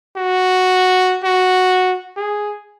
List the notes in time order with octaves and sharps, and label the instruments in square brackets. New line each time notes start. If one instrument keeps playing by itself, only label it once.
[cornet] F#4
F#4
G#4